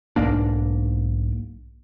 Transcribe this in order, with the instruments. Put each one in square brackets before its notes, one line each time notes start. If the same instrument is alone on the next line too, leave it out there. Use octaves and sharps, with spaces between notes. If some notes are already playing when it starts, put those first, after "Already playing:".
[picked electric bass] B1 G#2 A#3 D4